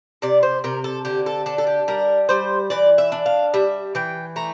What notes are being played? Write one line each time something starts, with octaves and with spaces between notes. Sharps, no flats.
C3 D5
C5
C3 A#4
A4
D3 G4
A4
D4 A4
A4
G4
G3 A#4
G3 C5
E3 D5
E5
D4
F5
G3 E5
E3 G5
A3 A#5